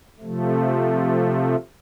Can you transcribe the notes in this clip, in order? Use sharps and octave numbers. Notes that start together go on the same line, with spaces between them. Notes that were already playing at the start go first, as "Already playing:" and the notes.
C3 F3 A3